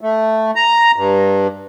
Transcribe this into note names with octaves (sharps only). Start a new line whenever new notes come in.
A3
A#5
G2